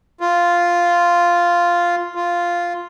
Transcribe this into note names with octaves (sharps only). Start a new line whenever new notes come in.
F4
F4